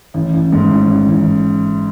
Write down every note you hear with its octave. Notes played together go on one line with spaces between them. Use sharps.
A1
A1
G#2
A1
A1
A1